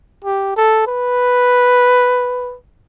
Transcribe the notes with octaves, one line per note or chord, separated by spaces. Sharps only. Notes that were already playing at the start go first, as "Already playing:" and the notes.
G4
A4
B4